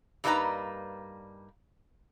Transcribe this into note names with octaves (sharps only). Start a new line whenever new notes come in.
G2 G3 A#3 D#4 B4 A#5